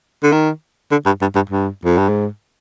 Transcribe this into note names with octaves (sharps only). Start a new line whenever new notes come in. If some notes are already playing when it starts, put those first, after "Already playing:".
D3
D#3
D3
G2
G2
G2
G2
F2
G2
G#2